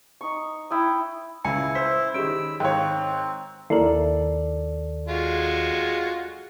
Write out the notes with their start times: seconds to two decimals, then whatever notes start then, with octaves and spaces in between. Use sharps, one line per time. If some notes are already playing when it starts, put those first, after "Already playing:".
0.21 D#4 C#6
0.70 E4 G5 D#6
1.45 C#2 C#3 E4 G#5 C#7
1.75 C5 E6 B6
2.14 D#3 C#4 G4 G#4 B5 E6 D7
2.60 G#2 D#3 C4 C#5 F5 G5
3.70 D#2 E4 A4 A#4 D5
5.08 G#3 F4 F#4